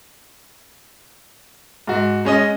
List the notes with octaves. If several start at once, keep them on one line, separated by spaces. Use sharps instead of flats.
G#2 F#4
G#3 C#4 D#5